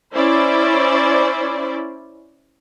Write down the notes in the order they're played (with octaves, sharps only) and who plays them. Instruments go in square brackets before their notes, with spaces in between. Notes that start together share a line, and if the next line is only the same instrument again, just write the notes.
[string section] C#4 E4 C5 D5